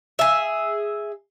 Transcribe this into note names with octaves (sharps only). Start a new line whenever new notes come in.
G#4 E5